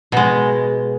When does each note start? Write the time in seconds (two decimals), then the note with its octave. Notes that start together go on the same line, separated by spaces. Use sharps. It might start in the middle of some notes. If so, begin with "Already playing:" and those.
0.12 B2 G#3